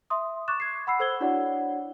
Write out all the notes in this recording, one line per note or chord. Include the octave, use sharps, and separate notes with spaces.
E5 C6 D#6
C#6 D6 F#6 A6 E7
G#6 C7
F#5 B5 E6 C7
A4 C5 E6 G#6 G7
D4 E4 F#4 C#5 D5 F#5